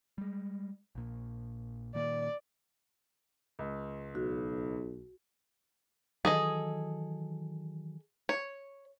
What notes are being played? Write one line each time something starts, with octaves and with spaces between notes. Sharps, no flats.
G3 G#3
A#1 A#2
A#2 D#3 A#3 D5
C#2
B1 F#4
D#3 E3 F#3 G#4 A4 D#5
C#5